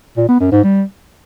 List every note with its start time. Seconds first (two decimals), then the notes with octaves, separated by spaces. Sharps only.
0.17 A#2
0.28 B3
0.40 F#2
0.52 G#2
0.63 G3